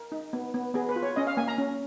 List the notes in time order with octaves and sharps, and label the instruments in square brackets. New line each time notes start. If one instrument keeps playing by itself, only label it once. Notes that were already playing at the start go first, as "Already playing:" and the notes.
Already playing: [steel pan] A#4
D#4
B3
B3
B3 G#4
B4
F4
C#5
C#4 D#5
F5
A#3 G#5
A#5
C#4